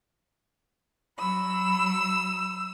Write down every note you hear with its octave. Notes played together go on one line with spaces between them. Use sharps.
F#3 B5 E6